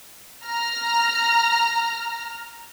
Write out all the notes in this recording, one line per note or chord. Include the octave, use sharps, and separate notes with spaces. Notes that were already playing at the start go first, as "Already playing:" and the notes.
A#5 F6